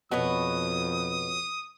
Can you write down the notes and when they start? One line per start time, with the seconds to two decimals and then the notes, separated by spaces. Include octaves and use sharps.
0.12 F2 B2 F#4 B4 C#5 D#6